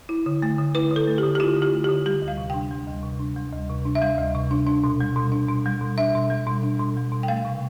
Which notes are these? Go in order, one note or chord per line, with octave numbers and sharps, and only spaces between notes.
E4
D3
A3
D3
E4 B4
D3
A4
A3
D3 G4
G4
E4 F4
D3
G4
A3
D3 G4
G3 G4
D2
F5
C3
D4 G5
G3
D2
C3
D4
G3
D2
C3
D4
E5
G3 F5
D2
C3
D4
D4
B2
G3
B2
D4
B2
G3
B2
D4 E5
B2
G3
B2
D4
B2
G3
B2
G5
A3 F5
C3